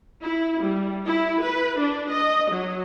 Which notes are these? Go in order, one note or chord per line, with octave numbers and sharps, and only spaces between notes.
E4
G3
E4
B4
D4
D#5
F#3